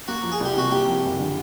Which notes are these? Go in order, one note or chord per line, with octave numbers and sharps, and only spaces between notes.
A#3 F#4
F3
G#4
C2 G4
C3 F#4
A#3 G4
F3
F#1
D3